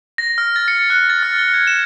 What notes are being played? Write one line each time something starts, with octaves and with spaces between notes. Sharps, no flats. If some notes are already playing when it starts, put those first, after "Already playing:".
A#6
F6
A6
C#7
F#6
A6
F6
G7
G#6
E7